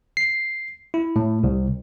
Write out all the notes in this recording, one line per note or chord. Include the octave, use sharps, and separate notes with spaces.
C7
E4
A2
C2